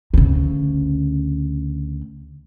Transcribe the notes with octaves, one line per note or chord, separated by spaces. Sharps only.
D2 C#3